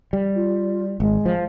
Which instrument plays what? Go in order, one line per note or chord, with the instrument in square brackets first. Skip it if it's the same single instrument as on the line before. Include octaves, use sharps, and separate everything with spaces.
[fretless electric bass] G3
[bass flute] F4
[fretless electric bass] G#1 [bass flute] G#3
[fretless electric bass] F3